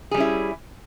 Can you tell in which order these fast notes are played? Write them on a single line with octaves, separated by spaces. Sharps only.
G#4 G3 C#4 E4